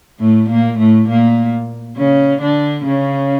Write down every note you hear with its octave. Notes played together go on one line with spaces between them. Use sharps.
A2 A3
A#2 A#3
A2 A3
A#2 A#3
C#3 C#4
D3 D4
C#3 C#4